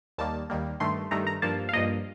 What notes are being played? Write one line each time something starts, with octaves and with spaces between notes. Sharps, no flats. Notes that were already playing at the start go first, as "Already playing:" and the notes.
D#2 D#3 G3 A#3 A5
D#2 D#3 G3 A#3
G2 D#3 A3 C6
G2 D#3 A3 A#5
A#5
G2 F3 A#3 A5
F5
G2 F3 A#3 D#5